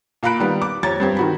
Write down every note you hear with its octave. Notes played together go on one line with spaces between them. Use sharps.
A#2 F5 A#5 B5 F#6 D7
D#3 G3 B3
D6
F2 G4 C#5 A#5 G#6 A6
G2 C4 G4
D#3 F#4 B5